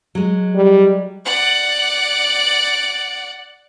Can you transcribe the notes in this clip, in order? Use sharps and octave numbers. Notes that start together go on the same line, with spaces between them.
F#3 G#3
G3
D5 F#5